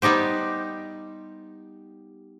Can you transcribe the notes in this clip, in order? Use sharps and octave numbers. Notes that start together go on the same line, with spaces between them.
G3 B3 D#4 G4 C5